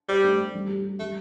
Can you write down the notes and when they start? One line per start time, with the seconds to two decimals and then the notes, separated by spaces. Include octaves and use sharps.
0.09 G3 C5
0.23 A3
0.38 A3
0.54 G3
0.69 G4
0.84 G4
1.00 G3 A3